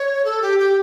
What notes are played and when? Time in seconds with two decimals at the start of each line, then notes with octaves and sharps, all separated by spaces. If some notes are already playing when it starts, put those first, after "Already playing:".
Already playing: C#5
0.25 A4
0.42 G4
0.59 G4